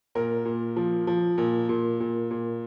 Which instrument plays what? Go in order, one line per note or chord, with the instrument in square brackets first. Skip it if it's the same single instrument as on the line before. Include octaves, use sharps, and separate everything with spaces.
[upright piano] A#2 A#4
A#2
F3
F3
A#2
A#2
A#2
A#2